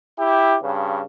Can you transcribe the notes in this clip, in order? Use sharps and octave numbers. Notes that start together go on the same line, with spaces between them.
E4 G4
G2 C#3